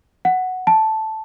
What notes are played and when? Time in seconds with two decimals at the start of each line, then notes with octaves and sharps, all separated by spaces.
0.25 F#5
0.67 A5